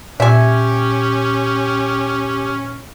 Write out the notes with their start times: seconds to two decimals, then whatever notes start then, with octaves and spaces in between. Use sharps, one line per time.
0.20 A#2 C#4 G4 E5 G#5